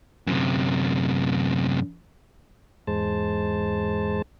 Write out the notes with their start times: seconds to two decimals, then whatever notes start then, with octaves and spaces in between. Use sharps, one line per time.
0.27 F#2 C3
2.87 E2 G#2 G#3 C5 A5